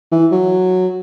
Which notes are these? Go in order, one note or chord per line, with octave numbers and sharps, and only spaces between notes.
E3
F#3